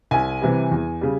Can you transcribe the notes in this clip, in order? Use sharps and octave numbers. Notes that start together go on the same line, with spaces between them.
C2 G#5
C3 E3 G3
E2
C#3 G3